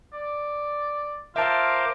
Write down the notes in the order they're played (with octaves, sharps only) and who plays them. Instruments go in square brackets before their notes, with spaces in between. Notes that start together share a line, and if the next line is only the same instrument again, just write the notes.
[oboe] D5
[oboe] F4 [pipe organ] A#4 C5 D6 [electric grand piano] E5 A5